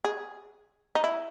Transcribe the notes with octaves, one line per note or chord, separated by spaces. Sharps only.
G#4
D#4
E4